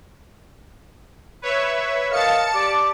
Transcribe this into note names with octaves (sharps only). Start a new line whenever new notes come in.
B4 C#5 E5
A#4 D#5 F5 A5 A6 C#7
G4 D5 D6